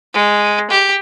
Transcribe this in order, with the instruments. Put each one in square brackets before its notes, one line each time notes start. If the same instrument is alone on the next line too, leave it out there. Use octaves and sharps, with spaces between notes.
[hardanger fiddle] G#3
G4